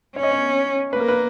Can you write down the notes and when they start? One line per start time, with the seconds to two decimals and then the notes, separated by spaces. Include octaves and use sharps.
0.16 C#4 C#5
0.23 D#5
0.31 C#5
0.93 A#3 B4
1.00 A#4
1.08 B4